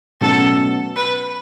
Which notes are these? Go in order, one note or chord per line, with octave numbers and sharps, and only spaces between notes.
B2 F#3 A3 C#4 A4
B4